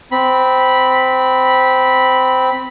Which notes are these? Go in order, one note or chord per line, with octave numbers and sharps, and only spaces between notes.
C4 B5